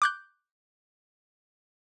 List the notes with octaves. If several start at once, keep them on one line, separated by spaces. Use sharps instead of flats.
D6 F#6 G6